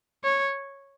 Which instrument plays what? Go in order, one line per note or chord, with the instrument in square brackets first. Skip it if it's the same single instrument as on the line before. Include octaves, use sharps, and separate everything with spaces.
[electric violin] C#5